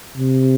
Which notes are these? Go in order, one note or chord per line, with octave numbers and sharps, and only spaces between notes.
C3